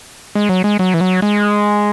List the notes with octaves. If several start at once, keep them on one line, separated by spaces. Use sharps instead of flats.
G#3
F#3
G#3
F#3
E3
F#3
G#3